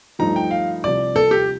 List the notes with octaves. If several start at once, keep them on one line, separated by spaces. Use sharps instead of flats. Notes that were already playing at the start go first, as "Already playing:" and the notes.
G2 F3 A3 D#4 A#5
G5
F5
C2 C3 F3 D5
A4
G4